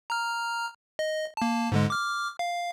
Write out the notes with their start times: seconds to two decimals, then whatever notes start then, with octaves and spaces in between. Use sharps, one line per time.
0.10 A#5 F6
0.99 D#5
1.37 A#3 A5
1.72 G#2 D3 G#3
1.90 D6 F6
2.39 F5